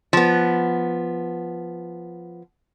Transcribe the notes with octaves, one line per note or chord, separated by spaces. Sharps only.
F3 B3